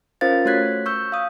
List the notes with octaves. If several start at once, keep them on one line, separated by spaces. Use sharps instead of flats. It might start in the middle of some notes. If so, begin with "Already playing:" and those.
C#4 F4 A#4 C5 F5 A6
A3 F#4 C#5 F#6 G#6 B6
C#6 E6 G6
F5 D#6